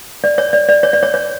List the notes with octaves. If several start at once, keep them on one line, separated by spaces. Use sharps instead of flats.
D5
C#5
D5
D5
C#5
D5
C#5
C#5